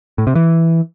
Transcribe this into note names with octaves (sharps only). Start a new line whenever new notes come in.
A2
C3
E3